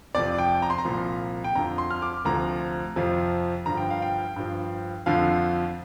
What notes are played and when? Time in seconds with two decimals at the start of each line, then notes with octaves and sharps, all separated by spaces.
0.15 F2 C3 F3 D5
0.38 G5
0.62 A#5
0.70 C6
0.78 A#5
0.85 C2 A#2 F3
1.44 G5
1.55 F2 D3 F3 A#5
1.78 C6
1.90 F6
2.02 D6
2.25 D2 C3 F3 A#5
2.96 F2 C3 F3
3.66 G2 D3 F3 A#5
3.77 G5
3.90 F5
4.02 G5
4.36 G2 F3
5.06 F2 D3 F3 F5